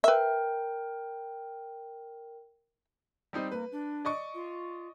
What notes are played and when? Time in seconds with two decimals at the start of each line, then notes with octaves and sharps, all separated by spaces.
0.04 A#4 B4 E5 G5
3.33 G3 C4 D#4
3.52 A#3 B4
3.72 D4
4.05 D5 D#5 C#6
4.35 F4